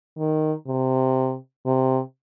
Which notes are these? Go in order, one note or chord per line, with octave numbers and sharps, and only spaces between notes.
D#3
C3
C3